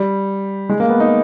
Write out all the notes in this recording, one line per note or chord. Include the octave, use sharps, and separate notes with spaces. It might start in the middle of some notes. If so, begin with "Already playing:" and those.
Already playing: G3
G#3
A#3
B3
D#4